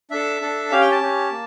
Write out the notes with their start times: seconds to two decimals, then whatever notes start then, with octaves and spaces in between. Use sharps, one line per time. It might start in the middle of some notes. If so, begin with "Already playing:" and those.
0.11 D4 A4 E5
0.41 D4 A4
0.71 C#4 G4 F5
0.81 G5
0.91 A5
1.01 C#4 G4
1.31 A#3